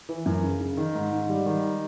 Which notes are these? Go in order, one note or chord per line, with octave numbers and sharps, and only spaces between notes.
E3
F#2
C#3
C#3
D#3
G#2
G#2
G3
D#3